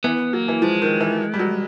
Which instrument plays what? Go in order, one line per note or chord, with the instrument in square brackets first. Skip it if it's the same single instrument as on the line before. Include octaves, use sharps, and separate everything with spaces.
[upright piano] E3 [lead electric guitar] B3
[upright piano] F#3 [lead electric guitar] A#3
[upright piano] E3
[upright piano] F3 [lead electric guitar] G#3
[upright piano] D#3
E3
G3
F#3